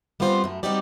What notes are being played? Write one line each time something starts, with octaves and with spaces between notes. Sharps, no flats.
G3 B3 C4 F4 C5
F#2 A3
G3 C4 D#4 F#4 G4 D5